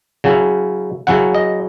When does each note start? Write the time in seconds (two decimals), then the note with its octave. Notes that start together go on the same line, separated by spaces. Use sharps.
0.24 C#3 F#3 C#4 E4
1.07 C#3 F#3 C#4 E4 F#5
1.34 D#5